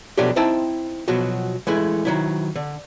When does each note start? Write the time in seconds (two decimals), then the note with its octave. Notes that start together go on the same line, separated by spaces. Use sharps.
0.18 B2 F3 F#3 A3 D4 G4
0.36 C4 D#4 E4 C5 G5 A5
1.08 B2 F3 F#3 F#4
1.67 E3 G#3 A3 E4
2.05 D#3 F#3 E4
2.56 D3